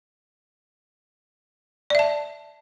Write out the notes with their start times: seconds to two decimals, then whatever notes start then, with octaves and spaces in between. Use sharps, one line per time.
1.90 D5
1.95 E5
1.99 A5